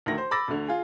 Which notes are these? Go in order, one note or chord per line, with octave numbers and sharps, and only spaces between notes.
D2 D#3 A#6
C5
B5 D6 E6 A6 A#6
D2 D3
F4 G#4